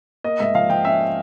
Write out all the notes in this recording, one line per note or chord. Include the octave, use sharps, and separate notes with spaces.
A#3 D#5
G#2 E5
F3 F5
F3 G5
C#4 E5